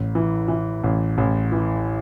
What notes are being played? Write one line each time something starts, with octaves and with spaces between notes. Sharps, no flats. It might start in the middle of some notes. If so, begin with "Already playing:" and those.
Already playing: A1
E3
E3
A1
A1
E3